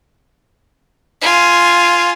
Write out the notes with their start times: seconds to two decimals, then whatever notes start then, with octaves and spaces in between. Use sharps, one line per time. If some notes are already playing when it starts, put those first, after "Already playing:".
1.22 F4 G#5